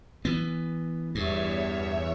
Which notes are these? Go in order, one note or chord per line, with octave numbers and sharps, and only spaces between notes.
E3 B3
E2 G2 C#5 E5